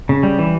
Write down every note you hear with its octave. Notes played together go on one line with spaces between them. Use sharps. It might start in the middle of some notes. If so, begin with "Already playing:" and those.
C#3
G3
E3